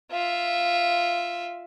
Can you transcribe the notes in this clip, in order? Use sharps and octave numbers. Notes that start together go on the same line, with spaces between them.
F4 E5